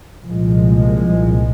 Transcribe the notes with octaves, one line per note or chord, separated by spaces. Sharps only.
C2 A#2 F3 G#3